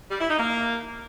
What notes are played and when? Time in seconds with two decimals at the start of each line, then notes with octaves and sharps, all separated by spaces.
0.10 G3
0.19 E4
0.29 D#4
0.38 A#3